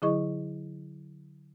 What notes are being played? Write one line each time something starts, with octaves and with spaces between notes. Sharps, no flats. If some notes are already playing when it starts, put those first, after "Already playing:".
D3 F#3 E4 G#4 D#5 C#6